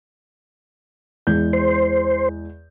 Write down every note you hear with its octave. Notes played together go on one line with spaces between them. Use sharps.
E2 G#3 G6
C5